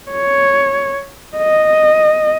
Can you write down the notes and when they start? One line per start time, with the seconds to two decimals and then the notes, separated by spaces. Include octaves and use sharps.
0.12 C#5
1.37 D#5